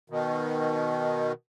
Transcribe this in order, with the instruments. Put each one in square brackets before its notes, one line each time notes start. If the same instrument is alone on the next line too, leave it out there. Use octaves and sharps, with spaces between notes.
[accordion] B2 D#3